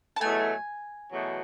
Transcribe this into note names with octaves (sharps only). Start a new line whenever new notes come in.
A5
E2 B2 F#3 A3 G#5
E2 B2 F#3 A3